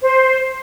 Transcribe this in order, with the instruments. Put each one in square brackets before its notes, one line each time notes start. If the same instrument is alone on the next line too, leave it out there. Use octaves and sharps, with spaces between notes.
[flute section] C5